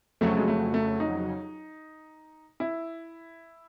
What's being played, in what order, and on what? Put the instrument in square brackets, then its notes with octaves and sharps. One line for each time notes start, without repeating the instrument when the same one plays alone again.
[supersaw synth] F2 C#3 F#3 [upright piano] A3
[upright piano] G#3
A3
A3
D#4
E4